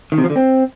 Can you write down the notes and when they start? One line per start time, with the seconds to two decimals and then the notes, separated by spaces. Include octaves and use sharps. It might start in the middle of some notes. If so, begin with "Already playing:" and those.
0.12 D#3
0.18 C3
0.24 F3
0.30 D3
0.36 C4